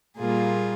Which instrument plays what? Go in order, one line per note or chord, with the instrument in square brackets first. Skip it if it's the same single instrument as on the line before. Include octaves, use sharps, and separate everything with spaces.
[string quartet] A#2 G3 A#3 F4 G#4